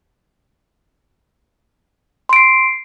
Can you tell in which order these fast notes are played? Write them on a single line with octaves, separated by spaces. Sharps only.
C6 D7 C7